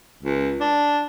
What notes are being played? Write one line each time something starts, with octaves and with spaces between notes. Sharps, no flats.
C#2
D4